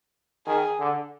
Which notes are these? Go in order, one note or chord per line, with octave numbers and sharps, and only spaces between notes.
D#3 G#4
D3